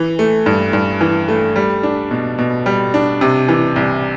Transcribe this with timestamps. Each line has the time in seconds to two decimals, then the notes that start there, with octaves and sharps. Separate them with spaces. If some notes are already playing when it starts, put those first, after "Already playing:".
Already playing: E3
0.19 A3
0.46 G2
0.73 G2
1.01 E3
1.28 A3
1.56 G3
1.83 D4
2.11 B2
2.38 B2
2.66 G3
2.94 D4
3.21 C3
3.48 E3
3.76 C2